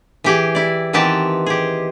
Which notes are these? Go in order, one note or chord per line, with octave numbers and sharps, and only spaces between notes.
E3 G4 G#4
E4 D5
D#3 E3 B3 C4 G4 A5
G4 G#4